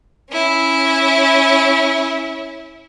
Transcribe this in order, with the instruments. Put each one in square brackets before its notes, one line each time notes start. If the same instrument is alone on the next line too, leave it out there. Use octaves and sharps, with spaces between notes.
[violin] C#4 E4